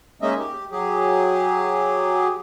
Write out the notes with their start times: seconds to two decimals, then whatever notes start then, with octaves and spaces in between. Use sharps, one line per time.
0.22 G#3 A#3 C#4 D#4 D#5 E5
0.39 G4
0.72 F#3 G4 G#4